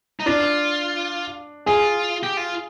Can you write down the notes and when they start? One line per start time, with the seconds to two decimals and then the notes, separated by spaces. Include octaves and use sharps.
0.20 D#4
0.26 D4 F4
1.66 F4 G#4
2.23 G4
2.37 F4